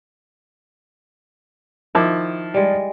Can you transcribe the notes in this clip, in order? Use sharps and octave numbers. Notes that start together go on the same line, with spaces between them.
D#3 F3 E4 D6
G3 G#3